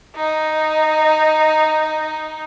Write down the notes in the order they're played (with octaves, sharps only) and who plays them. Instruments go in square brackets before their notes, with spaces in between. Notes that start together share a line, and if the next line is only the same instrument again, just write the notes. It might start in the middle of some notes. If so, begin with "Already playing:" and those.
[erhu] D#4 [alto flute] D#5